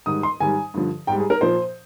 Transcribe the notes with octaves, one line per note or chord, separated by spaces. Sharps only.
G#2 D#3 G3 D#6
C6
G#2 D#3 G3 G#5
G2 D3 F3
G#2 G3 G5
G#4
A#4
A#2 F3 C5